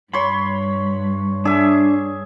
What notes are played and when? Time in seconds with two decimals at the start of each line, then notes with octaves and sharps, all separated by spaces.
0.13 G2 C#5 B5 C6
1.45 D4 G#4 E5